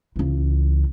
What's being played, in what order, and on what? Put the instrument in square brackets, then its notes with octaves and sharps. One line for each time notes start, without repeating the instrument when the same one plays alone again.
[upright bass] C#2 E3